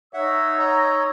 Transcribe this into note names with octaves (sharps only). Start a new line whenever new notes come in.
D#4 C#5 E5 F#5 E6 G#6
C#5 D#5 A#5